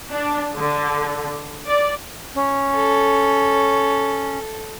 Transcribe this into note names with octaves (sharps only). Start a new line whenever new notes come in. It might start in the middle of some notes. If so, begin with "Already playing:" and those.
D4
D3
D5
C#4
A4